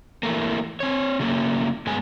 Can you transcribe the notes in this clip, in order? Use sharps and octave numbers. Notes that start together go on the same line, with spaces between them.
E3 A3 A#3
C4 C#5
C#3 F#3 A3 A#3 C#4
G2 G#3 B3 G#5